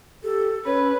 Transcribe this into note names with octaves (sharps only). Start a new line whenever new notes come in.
G4 A4
C#4 B4 C#5